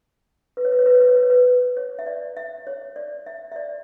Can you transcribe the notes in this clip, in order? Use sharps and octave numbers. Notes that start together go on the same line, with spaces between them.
B4
C#5
B4
C#5
B4
C#5
B4
C#5
B4
C#5
B4
C#5
E5
D5
E5
C#5
D5
E5
E5
D5